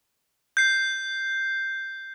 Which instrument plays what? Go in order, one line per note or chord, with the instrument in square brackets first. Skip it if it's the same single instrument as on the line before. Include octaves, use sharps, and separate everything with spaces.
[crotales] G6 C7